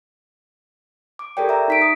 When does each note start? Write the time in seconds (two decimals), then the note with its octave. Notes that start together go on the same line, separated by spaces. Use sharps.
1.19 D6
1.37 G4 A4 A#4 D5 G5
1.49 E5 A#5
1.68 D#4 B6 D7
1.82 D#6